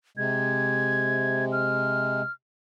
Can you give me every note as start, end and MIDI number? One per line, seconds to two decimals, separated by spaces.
0.17 2.22 48
0.17 2.22 56
0.17 1.45 92
1.52 2.31 89